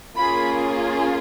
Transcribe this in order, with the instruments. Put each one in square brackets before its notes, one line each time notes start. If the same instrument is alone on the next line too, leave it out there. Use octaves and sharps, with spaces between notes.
[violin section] A#3 C#4 F4 G#4 B5